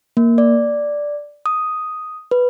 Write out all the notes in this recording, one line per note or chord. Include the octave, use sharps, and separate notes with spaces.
A#3
D5
D#6
B4